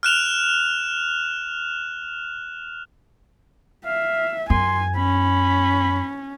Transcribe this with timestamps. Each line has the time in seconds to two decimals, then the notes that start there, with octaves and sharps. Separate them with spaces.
0.03 F6 F#6 E7 F7
3.85 E5 F5
4.50 F#2 G#5 C6
4.96 C#4 B5